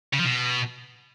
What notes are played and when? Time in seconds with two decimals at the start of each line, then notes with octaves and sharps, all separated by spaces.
0.13 C#3
0.19 F3
0.25 B2